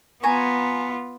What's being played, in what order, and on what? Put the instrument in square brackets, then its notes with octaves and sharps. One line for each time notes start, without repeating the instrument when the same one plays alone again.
[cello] B3 F4 [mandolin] G#5 A#5 C#6